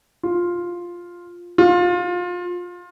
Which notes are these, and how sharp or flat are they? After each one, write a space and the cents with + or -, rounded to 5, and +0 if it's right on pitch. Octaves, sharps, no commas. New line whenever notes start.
F4 +5
F4 +25